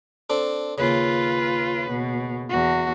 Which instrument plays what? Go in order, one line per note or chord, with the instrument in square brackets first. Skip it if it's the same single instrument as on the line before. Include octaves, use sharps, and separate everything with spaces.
[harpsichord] C4 D4 A4
[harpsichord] D#2 C#3 [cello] F4 B4
[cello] B2
E2 F#4